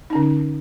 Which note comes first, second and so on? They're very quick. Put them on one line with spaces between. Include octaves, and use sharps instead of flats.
D#4 C#4 D3